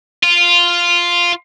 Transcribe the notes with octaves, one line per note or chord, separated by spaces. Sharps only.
F4